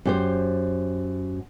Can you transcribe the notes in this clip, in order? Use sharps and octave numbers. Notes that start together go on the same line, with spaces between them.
F#2 G4 C5